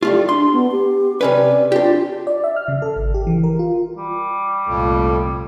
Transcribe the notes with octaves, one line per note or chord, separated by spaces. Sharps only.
G3 A3 F4 G4
D4 C6
B3
G4
C3 C#4 B4 D5
D4 F4 G4
D5
E5
F6
C#3
A4
G#1
G4
E3
A#4
F4
G3
C2 F2 A#2 A3